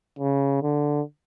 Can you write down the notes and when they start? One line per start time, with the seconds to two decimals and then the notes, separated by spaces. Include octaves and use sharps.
0.19 C#3
0.63 D3